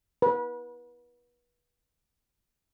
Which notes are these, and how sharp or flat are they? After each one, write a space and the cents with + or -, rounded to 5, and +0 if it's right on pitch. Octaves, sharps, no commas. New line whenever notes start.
B4 -30